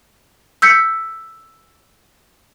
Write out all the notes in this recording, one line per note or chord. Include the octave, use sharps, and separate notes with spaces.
E6 G6 B6 C#7